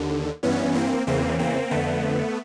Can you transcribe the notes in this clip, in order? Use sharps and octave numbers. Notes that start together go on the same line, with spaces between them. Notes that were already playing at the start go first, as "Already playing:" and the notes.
Already playing: D#2 D3
G2 E3 B3 C#4
A#3 C4
E2 C#3 E3 A#3 C4
A#3 C4
F2 D3 A3 B3